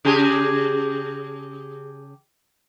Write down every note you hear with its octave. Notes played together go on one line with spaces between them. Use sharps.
C#3 G4 G#4